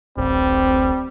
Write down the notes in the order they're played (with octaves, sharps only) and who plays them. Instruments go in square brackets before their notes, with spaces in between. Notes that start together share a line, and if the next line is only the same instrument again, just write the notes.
[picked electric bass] D1 A1 [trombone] G3 [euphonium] C4